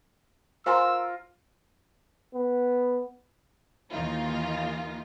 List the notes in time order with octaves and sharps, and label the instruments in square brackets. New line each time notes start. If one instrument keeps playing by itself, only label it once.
[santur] F4 A#4 [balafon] C5 G#5 C6 [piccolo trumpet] E6
[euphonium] B3
[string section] D#2 D#3 E3 A#3 D#4 F4